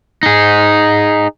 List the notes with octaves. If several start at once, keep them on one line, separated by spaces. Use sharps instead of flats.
D#4 G#4